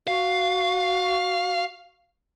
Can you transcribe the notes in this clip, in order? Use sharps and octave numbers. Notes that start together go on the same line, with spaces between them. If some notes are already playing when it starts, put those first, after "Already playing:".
F#4 F5